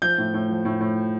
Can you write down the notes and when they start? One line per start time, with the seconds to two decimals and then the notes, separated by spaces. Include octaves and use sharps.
0.02 F3 G6
0.18 A2
0.34 A2
0.49 F3
0.65 A2
0.81 A2